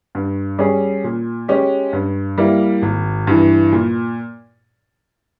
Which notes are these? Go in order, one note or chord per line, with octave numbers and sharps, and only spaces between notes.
G2
G3 C#4 G#4
A#2
G#3 C#4 G4
G2
G3 A#3 E4
G#1
G2 E3
A#2